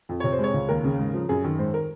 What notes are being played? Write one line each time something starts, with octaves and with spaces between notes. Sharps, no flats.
F2
C3 C#5
C5
G#3 C#5
C#2
D#2 A#4
C#3
G#2
F3
F#2 G#4
D#3
G#2 C5
A#4